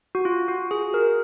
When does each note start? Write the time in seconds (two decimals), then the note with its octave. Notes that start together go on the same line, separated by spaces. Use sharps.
0.15 F#4
0.25 F4
0.48 F#4
0.71 G#4
0.94 A#4